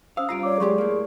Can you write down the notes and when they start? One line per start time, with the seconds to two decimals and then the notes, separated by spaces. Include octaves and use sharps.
0.17 C#4 C5 F5 D#6 E6
0.29 G2 F4 A#5 C7 D7
0.43 C#5 D5 D6
0.60 F#3 G#3 G4 G#4 D5 C6 C#6
0.78 A2 A#3